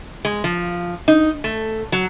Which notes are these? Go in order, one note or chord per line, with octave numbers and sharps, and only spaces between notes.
G#3
F3
D#4
A3
F#3